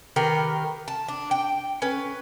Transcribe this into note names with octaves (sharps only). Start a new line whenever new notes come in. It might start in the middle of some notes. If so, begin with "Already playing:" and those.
D#3 G4 A#4 B4
A5
D4
G5
C#4 B4